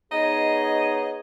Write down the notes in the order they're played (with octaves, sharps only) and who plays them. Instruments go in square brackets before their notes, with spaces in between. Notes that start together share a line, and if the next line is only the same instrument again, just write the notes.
[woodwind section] B3 G#4 C#5 [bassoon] D#4 [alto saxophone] D#5